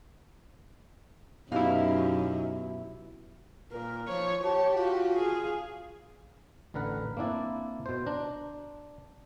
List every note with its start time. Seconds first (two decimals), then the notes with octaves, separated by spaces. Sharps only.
1.52 F#2 B2 D#4 E4 G4 F5
3.72 A#2 A#4
4.08 F3 C#5
4.44 G4 C#5 A5
4.75 F4 F#4
5.16 G#4 F5
6.74 A1 D3 A#4 B4 F#5
7.17 A#3 C4 D4 E4 D5
7.86 B2 C5
8.06 D4 A#5